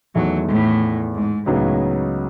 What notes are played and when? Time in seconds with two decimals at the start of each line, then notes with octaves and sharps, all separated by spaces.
0.15 E2 D#3 F#3 A3 E4
0.48 A2
1.14 G#2
1.46 C#2 A2 C#3 F#3 B3 D#4